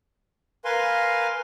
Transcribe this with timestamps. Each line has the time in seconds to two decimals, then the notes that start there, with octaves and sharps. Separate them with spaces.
0.65 A#4 B4 F5 G#5 C6